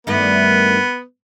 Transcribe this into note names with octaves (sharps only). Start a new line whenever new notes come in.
G2 D#3 A3 B3